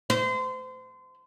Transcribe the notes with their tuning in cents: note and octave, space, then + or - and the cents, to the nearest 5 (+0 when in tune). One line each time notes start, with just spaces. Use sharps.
C5 -30